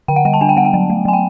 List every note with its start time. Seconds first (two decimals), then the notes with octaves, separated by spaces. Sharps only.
0.08 D3 G5
0.16 F#5
0.25 G3 G5
0.33 A5
0.41 D4 G#5
0.49 G5
0.57 B3 F#5
0.65 G5
0.74 F#3
0.90 A3
1.05 F#3 G#5
1.13 G5